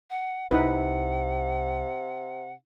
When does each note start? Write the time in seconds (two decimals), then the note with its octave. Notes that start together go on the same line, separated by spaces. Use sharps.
0.10 F#5
0.51 C2 C3 D#4 E4 B4 F#5